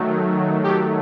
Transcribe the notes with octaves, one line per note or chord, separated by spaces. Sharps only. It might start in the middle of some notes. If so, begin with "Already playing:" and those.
Already playing: D#3 F#3 A3
D#3 F#3 A3 G4